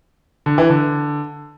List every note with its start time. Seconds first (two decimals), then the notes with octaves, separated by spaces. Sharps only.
0.46 D3
0.58 E3
0.70 D3